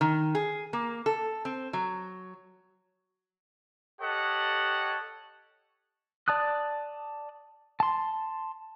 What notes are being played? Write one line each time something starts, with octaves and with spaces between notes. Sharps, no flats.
D#3
G#4
A#3
A4
C4
F#3
G4 A4 C#5 D#5 F#5
D5 A5 D#6 F#6
A5 C6